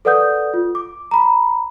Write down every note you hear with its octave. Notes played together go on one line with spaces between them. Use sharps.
A4 B4 D5 F#5 D#6 G6
F4
D6
A#5 B5